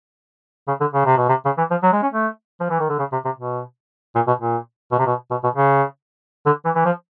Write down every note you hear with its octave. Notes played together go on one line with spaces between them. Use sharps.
C#3
D3
C#3
C3
B2
C3
C#3
E3
F3
F#3
G#3
C#4
A3
F3
E3
D#3
D3
C#3
C3
C3
B2
A#2
B2
A#2
B2
C3
B2
B2
B2
C#3
D3
E3
E3
F3